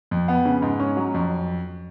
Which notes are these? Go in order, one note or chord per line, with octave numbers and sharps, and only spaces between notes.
F2
B3
C#3
G#2
C#4
F#3
F2